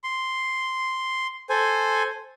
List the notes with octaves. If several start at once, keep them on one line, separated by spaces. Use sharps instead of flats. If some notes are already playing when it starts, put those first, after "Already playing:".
C6
A4 C5 G#5